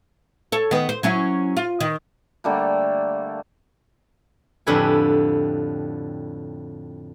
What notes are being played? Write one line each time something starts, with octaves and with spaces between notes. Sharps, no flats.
A4 C#5
D#3 B3
C5
F#3 C#4 E4
F4
D#3
D3 G3 A3 A#3
F2 A2 D3 G4 B4 G#5